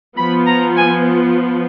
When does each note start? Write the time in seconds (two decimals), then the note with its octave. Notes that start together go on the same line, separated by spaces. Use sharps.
0.17 F3 B3 B5
0.47 A#5
0.76 G#5